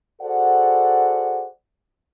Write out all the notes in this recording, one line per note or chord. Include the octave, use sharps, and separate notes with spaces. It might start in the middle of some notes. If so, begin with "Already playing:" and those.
F#4 G#4 A4 C5 D5 F#5